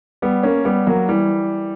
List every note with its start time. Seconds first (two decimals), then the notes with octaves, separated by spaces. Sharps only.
0.22 G3 B3
0.43 A#3 C#4
0.65 G3 B3
0.87 F#3 A#3
1.08 E3 G3